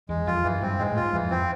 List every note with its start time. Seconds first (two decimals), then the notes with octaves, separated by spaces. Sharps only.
0.09 E2 G#3
0.27 F2 F4
0.44 F#2 E3
0.61 G2 C4
0.79 G#2 G#3
0.90 A2
0.96 F4
1.02 G#2
1.13 F2 E3
1.31 C4